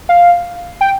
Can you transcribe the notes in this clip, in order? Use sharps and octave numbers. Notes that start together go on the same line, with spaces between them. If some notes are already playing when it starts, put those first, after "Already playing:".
F5
G5